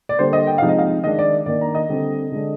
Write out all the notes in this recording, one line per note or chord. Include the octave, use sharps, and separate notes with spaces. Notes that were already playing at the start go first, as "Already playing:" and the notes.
D5
D3 G3 A#3 D4 C5
D#5
G5
C3 F3 G#3 D#4 F5
D#5
F5
D#3 G#3 D4 D#5
D5
D#3 A#3 D4 D5
A#5
D#5
D3 G3 C4
D3 G#3 D4